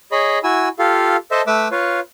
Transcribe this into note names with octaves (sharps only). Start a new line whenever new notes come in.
G#4 C#5 D#5 B5
E4 F#4 G#5 E6
F4 G4 A4 F5
A4 C5 D#5 E5 A5
A3 B4 E5 D6 E6
F4 B4 C#5 F5